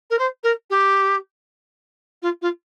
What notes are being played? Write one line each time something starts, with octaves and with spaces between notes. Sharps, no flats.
A#4
C5
A#4
G4
F4
F4